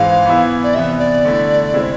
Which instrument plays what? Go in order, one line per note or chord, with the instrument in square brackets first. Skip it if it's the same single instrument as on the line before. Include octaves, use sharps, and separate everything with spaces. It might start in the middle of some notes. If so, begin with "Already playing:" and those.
Already playing: [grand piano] G#2 E3 G#3 C4 [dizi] F5
[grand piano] E3 B3 E4
[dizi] D5
[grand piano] C3 E3 B3 [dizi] E5
[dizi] D5
[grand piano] D3 A3 E4
C3 G#3 C4 E4